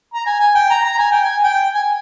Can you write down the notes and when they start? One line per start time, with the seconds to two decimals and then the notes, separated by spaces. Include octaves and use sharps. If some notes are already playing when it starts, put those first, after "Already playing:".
0.14 A#5
0.26 G#5
0.40 G#5
0.55 G5
0.70 A#5
0.85 A#5
0.98 G#5
1.12 G5
1.24 G#5
1.44 G5
1.74 G#5